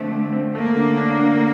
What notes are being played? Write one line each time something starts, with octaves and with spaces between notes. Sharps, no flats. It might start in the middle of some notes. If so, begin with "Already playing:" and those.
Already playing: D3 F3 A3 C4
D3
C4
A3 A#3
D3
D4
D3